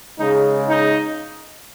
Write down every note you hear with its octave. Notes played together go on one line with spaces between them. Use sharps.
C#3 G#3 D#4
D#4